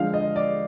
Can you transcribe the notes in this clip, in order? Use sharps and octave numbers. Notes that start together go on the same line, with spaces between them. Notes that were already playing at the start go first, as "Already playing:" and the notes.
Already playing: D3 F3 G#3 F5
D#5
D5